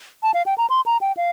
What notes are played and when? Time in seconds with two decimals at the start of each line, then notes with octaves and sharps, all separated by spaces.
0.23 A5
0.34 F5
0.46 G5
0.58 A#5
0.70 C6
0.86 A#5
1.01 G5
1.17 F5